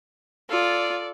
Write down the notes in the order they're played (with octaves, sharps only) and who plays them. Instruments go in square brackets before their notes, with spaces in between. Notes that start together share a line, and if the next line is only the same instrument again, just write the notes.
[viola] F4 [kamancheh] A4 D5